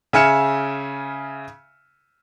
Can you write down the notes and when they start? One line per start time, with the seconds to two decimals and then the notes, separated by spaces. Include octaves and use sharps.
0.13 C#3 E5 G#5 F6 C#7 E7